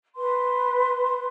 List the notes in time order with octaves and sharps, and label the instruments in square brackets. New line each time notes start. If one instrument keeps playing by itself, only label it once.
[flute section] B4 C6